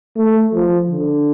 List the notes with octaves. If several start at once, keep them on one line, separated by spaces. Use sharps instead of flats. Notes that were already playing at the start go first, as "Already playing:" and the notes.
A3
F3
D3